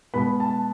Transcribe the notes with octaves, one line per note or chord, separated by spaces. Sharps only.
B2 G#3 B3 B5
A5